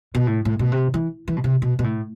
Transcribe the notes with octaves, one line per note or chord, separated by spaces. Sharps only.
B2
A2
A2
B2
C3
E3
E3
B2
C3
B2
B2
A2